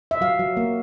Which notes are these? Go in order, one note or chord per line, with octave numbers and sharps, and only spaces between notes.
E5
F#3 F5
F#3
A#3